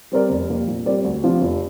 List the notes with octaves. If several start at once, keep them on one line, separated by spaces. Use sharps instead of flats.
G3 C4 A#4 D5
F1
F2 C3 A#3
A#2
G3 C4 A#4 D5
D2
C3 F3 D4 F4
F1